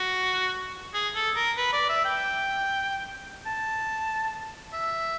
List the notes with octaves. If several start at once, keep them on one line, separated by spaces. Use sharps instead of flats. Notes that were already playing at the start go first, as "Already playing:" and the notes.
Already playing: F#4
G#4
A4
A#4
B4
D5
E5
G5
A5
E5